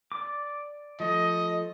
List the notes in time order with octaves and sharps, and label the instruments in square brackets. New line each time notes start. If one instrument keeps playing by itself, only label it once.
[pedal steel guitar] D5 D6
[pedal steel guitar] F3 A3 [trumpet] D#5